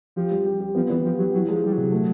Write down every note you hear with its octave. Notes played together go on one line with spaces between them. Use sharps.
F3 G4
G3
G4
G4
F3 B3
E3 B3
F3 G4
F#3 G4
E3 F#3
F3 G#3
G3 G#3
C3 F#3
A3